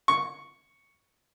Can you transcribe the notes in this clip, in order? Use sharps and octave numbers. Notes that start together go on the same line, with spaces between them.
C#6